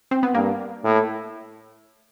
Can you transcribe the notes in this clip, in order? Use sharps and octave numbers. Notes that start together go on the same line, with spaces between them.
C4
B3
G2 A#3
A2